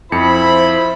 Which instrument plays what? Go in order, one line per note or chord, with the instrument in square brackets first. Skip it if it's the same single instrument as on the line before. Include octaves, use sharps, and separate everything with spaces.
[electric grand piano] F2 C#7 [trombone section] F3 E4 [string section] C5 [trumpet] B5